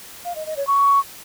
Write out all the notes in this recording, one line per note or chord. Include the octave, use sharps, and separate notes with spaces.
F5
D#5
D#5
C#5
C#6